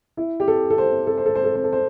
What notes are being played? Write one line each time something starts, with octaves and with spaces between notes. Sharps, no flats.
E4
G4
A4
A4
C5
A4
C5
A4
C5
A4
C5
A4
C5